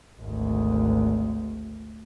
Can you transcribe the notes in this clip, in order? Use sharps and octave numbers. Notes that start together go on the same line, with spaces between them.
G#1 D2